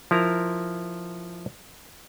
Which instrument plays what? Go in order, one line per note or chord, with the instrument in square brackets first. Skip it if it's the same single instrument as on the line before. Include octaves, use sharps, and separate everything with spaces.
[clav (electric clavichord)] F3 E4 A#4 A#5